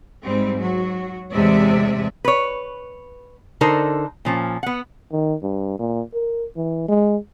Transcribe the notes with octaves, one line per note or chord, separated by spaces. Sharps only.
G#2 G3 C4
F#3 F#4
E2 A2 C3 G#3 D5 E5
B4 C#5
D3 D#4 A4 A#4 C5
A#2 F3 C#4
B3 F#5
D#3
G2
A#2
A#4
E3
G#3